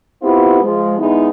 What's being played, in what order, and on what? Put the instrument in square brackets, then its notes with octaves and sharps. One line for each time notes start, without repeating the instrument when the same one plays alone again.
[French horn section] B3 C4 E4 F4 G4
F3 G#3
D3 G#3 B3 D#4 E4